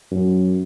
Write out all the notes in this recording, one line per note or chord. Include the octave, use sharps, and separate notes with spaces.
F#2